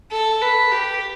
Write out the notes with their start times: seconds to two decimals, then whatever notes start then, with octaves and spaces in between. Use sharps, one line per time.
0.12 A4
0.42 B4
0.72 G4